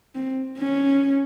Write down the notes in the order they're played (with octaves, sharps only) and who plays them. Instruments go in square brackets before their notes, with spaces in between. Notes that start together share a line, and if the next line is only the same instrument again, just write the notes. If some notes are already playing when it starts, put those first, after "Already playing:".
[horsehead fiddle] C4
C#4